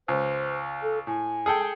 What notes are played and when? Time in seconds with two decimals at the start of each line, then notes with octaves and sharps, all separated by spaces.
0.08 C#2 C5
0.83 A4
1.07 A2 G#5
1.46 G#4 A4 G5